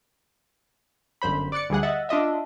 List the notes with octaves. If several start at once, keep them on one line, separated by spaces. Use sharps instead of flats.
G1 F#2 C5 B5
D5 D6 F#6 A6 C#7
D2 G3 G#4 F#5
D#5 E5 F#5 A6
D4 F4 D#5 E5